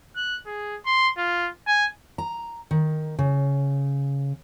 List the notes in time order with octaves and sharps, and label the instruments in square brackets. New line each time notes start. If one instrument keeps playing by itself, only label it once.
[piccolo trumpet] F#6
G#4
C6
F4
G#5
[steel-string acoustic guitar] A#5
D#3
C#3